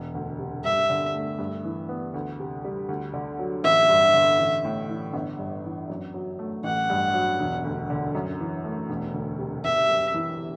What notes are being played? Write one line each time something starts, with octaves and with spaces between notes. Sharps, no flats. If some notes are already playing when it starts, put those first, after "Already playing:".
Already playing: E1
D2
C3
G2 E5
D3
A3
G2
E3
B3
D2
C3
G3
D2
D3
F#3
A1 E5
G2
D3
A1
A2
E3
G1
G2
E3
F#2
F#3
A3
A1 F#5
G2
F#3
E1
D2
D3
F#2
E3
A3
E1
D2
C3
G1 E5
F#2
E3